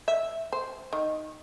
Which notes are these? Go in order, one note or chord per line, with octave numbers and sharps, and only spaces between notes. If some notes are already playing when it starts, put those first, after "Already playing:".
E5
C5
D#3